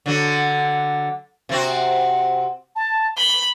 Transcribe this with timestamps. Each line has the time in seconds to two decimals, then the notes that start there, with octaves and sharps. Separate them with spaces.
0.06 D3 F#3
1.49 C3 C4 F#4
2.76 A5
3.17 B5 G7